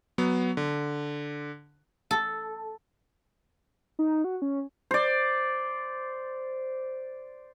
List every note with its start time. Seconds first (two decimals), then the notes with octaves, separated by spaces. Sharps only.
0.18 F#3 B3
0.57 D3
2.11 A4
3.99 D#4
4.24 F#4
4.42 C#4
4.91 C5 D5